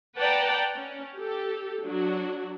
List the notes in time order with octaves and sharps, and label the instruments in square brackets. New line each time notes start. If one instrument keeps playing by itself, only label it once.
[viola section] B4 D5 F#5 G5 A5 A#5
C#4
G4 A4
F#3 D4 F#4